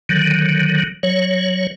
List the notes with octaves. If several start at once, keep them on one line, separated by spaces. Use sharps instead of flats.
D3 D#3 F#3
F#3 C#5